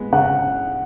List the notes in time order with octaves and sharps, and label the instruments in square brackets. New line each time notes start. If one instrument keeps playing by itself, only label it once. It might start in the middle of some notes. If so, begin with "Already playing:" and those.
Already playing: [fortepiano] G#3 B3
[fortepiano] C#3 [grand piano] F#5